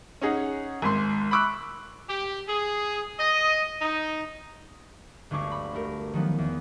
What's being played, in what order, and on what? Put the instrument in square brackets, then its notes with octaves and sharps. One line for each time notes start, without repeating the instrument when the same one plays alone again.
[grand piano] C#4 D#4 G#4 F#5
G#1 G#2 C6
B5 C#6 D6 E6 F#6
[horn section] G4
G#4
D#5
D#4
[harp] G1 D2 G#3 C#6 D6
B5
A3 G4 A#4
D#3 F3 F#3 B3
E2